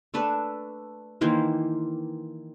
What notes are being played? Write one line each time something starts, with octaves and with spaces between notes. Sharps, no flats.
A3 D4 A4 B4
D#3 E3 A#3 C5